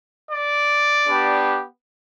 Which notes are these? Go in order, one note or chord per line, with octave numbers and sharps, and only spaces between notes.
D5
B3 D4 G4